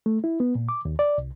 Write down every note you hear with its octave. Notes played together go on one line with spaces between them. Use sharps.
A3
E4
B3
A#2
D6
D#2
D5
C2